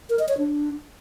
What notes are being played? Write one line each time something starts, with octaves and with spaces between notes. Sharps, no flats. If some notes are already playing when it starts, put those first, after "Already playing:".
A#4
D#5
C#5
D4